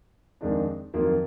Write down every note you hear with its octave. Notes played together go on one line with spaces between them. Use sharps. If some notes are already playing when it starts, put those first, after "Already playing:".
F2 D#3 G#3 D4
F2 D#3 F#3 A#3 F4